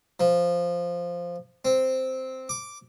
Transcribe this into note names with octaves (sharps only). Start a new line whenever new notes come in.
F3
C4
D6